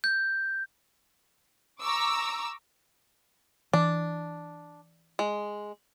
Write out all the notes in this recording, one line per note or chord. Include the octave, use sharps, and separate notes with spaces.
G6
A#5 C#6 D6 E6
E3 D4
G#3